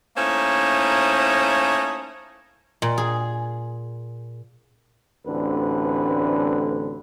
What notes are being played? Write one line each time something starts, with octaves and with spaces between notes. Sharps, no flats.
A3 A#3 C#4 D#4 E4 C5
A#2
G#4
A1 D2 D3 C4 B4